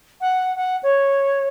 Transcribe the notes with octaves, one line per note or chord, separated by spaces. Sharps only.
F#5
F#5
C#5